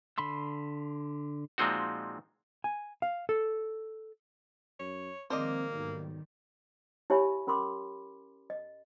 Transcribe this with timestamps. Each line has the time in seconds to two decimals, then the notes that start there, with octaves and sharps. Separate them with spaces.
0.18 D3 B5 C6 E6
1.58 A#2 F3 G#3 C4 D#4 F#4
2.64 G#5
3.02 F5
3.29 A4
4.80 F#2 C#5
5.30 D#3 F3 G#3 A#3 C4 C5 D5 D#5
5.72 B1 G#2 D#3 G3
7.10 E4 G4 C#5 E5 G#5 B5
7.47 C#4 A#4 B5 C6 D6
8.50 D#5